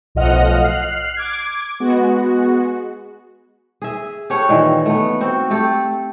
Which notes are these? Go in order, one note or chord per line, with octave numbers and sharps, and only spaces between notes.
B1 A2 F3 D#5 F#5 F6
F6 F#6 C7
D6 G#6
G#3 B3 F#4
G#4 E5
G4 A4 C#5 F#5
A#2 D#3 E3
A3 B3
C4 F#4
A3 G4 A4